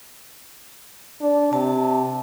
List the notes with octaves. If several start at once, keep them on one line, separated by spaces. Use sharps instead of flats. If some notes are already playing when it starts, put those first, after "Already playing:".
D4
C3 A5